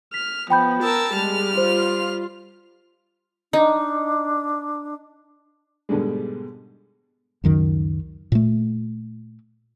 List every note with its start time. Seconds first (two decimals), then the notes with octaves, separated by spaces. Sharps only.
0.14 F6 B6
0.50 F3 B3 G5 B5 G6
0.82 A#4 A5 E6
1.14 G3 G#3 F6
1.57 F4 C5
3.53 D4 D#4
5.89 G#2 B2 D3 G3 G#3
7.44 C#2 F#2 D#3
8.32 A#2 A3